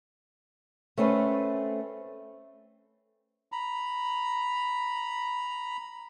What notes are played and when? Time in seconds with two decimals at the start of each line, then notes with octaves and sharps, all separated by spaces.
0.97 A3 C4 C#4 A4 B4
3.52 A#5 B5